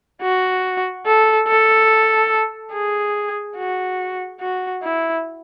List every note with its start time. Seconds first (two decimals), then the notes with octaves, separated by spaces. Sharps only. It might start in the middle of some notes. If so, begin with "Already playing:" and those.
0.21 F#4
1.05 A4
1.47 A4
2.72 G#4
3.57 F#4
4.40 F#4
4.82 E4